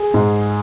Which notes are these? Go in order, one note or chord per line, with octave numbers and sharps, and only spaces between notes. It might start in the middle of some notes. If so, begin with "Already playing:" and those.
Already playing: G#4
G#2